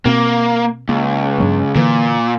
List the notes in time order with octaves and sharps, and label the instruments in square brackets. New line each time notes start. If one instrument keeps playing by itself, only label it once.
[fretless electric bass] B2 C4 [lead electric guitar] A#3
[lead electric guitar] C#2 [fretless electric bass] A#3
[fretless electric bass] G2 F#3 A#3
[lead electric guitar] A#2 [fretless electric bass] D3 E3